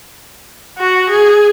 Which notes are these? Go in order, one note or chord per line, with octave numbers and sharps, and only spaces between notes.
F#4
G#4